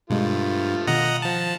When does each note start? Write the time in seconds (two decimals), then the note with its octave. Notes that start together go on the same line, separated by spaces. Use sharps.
0.10 G2 B2 F3 G#3 A3 F4
0.87 B2 D#3 D#5 F#5 A#5
1.22 F3 A5